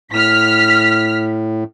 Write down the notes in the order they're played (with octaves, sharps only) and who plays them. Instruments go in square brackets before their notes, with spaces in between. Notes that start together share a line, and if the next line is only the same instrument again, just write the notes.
[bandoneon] A2 [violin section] F6 B6